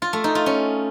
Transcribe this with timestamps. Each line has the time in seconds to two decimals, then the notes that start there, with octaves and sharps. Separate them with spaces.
0.02 F4
0.13 A3
0.24 D#4
0.35 F4
0.46 C#4